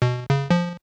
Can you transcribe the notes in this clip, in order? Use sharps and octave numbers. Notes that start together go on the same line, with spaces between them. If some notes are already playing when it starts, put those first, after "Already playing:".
B2
C#3
F3